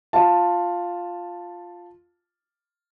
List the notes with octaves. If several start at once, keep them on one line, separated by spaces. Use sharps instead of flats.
F4 A5